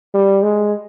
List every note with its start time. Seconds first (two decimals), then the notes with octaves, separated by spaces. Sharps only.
0.14 G3
0.43 G#3